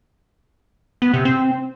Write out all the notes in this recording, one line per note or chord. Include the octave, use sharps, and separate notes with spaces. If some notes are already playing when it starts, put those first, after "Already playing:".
B3
C3
C4